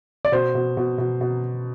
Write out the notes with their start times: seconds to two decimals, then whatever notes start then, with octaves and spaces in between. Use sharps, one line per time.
0.25 D5
0.32 B2 C5
0.55 B2
0.77 B2
0.98 B2
1.21 B2